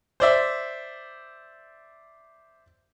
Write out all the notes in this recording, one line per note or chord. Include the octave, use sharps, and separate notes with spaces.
C5 D5 E5